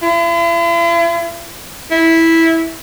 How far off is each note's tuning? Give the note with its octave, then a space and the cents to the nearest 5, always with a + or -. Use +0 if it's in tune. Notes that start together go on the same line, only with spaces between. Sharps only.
E4 +45
E4 -10